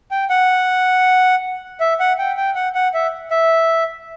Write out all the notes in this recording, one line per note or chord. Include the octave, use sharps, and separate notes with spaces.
G5
F#5
E5
F#5
G5
G5
F#5
F#5
E5
E5